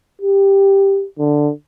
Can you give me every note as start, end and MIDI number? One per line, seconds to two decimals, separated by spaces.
0.22 1.05 67
1.19 1.51 50